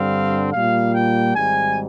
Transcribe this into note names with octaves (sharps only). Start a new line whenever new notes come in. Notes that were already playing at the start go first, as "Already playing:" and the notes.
Already playing: G2 D3 G3 C4 F5
A#2 G3 A#3 F4 F5
G5
G#1 G#2 G3 G#5